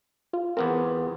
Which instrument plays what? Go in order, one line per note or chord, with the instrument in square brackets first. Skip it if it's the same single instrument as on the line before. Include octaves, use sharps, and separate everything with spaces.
[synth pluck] F4
[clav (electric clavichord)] E2 B3 C4 [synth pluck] A#4